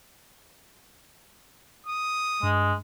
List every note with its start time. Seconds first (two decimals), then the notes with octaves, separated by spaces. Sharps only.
1.87 D#6
2.43 G2 G#3